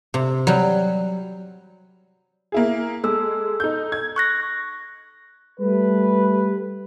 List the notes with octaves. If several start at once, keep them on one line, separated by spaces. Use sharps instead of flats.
C3
F#3 G3
A#3 E4 G#4
G#3 A4 E6
D#4 G6
G#6
C#6 F#6 A#6
G3 A3 G4 B4